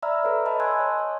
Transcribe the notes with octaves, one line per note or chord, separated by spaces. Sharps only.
D5 E5 A#5 B5 E6 F6
A4 B4 C#5
D#5 A5 B5
G#5 A5 C6 E6 F#6 G#6
C#5 D#5
C#5